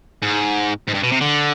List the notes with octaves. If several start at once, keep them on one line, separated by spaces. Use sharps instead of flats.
G#2
G#2
G2
B2
C3
D3